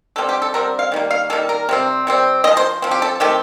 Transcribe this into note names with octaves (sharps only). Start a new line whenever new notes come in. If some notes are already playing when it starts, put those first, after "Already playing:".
D3 G3 C4 A4
G4
A4
D3 G3 C4 A#4
F5
D#3 G3 A#3
F5
D#3 G3 A#3 A4
A#4
C3 G3 C4
C3 G3 C4
C4 D#5
F3
C5
F3 C4
G4
A4
D#3 A3 C4 G4